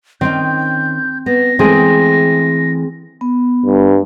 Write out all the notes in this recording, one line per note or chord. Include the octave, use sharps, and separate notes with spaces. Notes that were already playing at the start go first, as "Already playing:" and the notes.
D#3 C4 C#4 D#4 G6
B3 A#6
E3 G#3 A3 C4 G#4
B3
G2